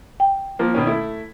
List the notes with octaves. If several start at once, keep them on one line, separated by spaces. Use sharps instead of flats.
G5
F3 A#3
B2 D#3 C#4
A3 E4